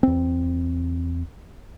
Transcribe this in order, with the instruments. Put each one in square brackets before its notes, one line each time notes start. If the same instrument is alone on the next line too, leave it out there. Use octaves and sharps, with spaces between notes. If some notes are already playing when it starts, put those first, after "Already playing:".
[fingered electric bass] E2 C4